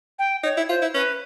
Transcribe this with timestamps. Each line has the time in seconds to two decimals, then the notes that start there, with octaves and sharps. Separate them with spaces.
0.19 G5
0.44 D#4 C#5
0.57 E4
0.69 F4 C5
0.82 E4
0.94 C#4 B4